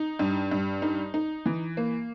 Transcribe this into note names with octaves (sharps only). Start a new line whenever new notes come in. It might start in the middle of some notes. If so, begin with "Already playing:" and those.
Already playing: D#4
G2
G2
D#4
D#4
E3
A#3